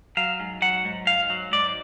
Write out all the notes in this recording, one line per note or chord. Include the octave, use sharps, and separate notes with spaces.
F#3 F5
G#2
F#3 F#5
G#2
G#2 F5
F#3
G#2 D5